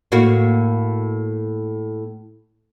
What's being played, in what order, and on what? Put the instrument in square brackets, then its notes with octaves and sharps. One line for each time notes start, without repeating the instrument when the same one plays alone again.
[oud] A2 A#3 F#4